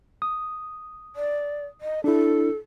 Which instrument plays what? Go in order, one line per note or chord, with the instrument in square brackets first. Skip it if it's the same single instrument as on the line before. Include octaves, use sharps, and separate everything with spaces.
[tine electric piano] D#6
[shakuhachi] D5
D#5
[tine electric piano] D4 E4 [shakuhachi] A4